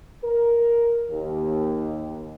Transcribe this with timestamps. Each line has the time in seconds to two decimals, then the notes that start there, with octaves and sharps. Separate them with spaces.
0.23 A#4
1.10 D#2